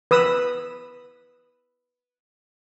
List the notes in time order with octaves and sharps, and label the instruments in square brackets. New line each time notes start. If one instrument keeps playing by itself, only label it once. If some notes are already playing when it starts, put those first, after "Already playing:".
[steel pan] B4 D#6 E6